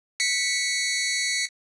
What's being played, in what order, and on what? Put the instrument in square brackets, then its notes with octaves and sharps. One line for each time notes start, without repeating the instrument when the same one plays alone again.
[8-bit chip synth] B6 C#7